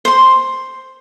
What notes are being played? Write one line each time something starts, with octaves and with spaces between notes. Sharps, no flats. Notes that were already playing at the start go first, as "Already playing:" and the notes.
C5 C6